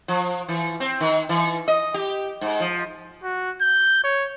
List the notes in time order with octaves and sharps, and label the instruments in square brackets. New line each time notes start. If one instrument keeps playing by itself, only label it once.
[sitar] F3
E3
C4
D#3
E3
D#5
G4
G#2
F3
[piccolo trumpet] F#4
G6
C#5